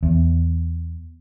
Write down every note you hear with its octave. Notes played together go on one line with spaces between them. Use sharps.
E2